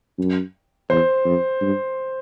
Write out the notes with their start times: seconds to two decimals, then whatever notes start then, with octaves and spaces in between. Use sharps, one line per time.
0.19 F#2
0.89 E2 C5
1.25 F2
1.61 G2